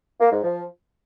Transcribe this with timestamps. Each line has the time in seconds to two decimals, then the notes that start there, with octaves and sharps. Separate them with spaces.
0.21 A#3
0.32 G#2
0.43 F3